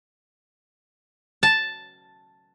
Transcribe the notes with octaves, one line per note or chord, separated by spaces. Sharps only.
A5